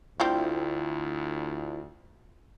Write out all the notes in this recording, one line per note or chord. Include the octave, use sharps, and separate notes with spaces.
D2 G3 C4 E4 F4 G4